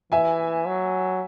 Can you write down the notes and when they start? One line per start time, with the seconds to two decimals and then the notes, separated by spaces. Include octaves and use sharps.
0.12 E3 E5 G#5
0.67 F#3